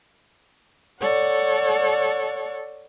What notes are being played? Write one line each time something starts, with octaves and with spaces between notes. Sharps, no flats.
A4 C#5 D5 F#5